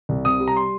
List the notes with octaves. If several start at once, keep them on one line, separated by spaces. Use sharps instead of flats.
C2
C3 D#6
G3
A#5
C6